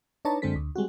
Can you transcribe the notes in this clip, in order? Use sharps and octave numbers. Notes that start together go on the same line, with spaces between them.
D4 D#4 B4 C#5 A5 A#5
F#2 D3 G#3 C4 A4 B6
D2
G3 G#3 C4 F#4